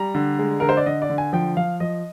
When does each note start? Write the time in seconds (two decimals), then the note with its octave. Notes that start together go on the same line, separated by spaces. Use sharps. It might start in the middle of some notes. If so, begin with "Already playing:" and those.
Already playing: G3 A#5
0.15 D3
0.39 G#3
0.60 D3 A#4
0.69 C5
0.77 D5
0.86 D3 D#5
1.02 D5
1.10 D3
1.18 G#5
1.33 F3 G5
1.57 F3 F5
1.80 F3 D#5